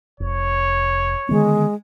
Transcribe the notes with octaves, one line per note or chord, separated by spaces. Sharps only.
F1 C#5
D3 D#3 G#3 B3